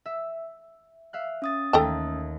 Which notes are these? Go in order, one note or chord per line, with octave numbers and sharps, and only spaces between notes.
E5
E5 F5 F#6
C#4 D#6 A6
D#2 A3 A4 G5 A5